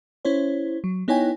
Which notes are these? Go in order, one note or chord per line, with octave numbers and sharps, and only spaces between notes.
C#4 E4 C5 C#5
F#3
B3 D#4 E4 C#5 G5 G#5